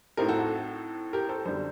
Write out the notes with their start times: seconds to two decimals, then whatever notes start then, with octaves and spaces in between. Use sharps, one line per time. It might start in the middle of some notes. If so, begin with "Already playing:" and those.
0.17 A2 A3 C4 D#4 G4 A#4
0.28 F#4 A4
0.39 F#4 A4
1.13 G4 A#4
1.29 A4 C5
1.45 F#2 D3 G3 A4 C5